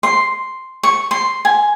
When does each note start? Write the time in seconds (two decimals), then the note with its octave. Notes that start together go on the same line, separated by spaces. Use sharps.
0.03 C6
0.83 C#6
1.11 C6
1.45 G#5